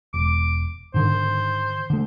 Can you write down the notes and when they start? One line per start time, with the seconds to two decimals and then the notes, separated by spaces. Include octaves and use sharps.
0.14 E1 D6
0.94 G#2 D3 D#3 C5
1.90 D3 A3